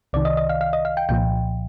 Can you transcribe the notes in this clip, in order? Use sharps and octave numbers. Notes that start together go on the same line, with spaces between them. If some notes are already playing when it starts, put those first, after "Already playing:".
C2 C3 D#3 D5
D#5
D#5
F5
F5
D#5
F5
G5
C2 A#2 F3 G5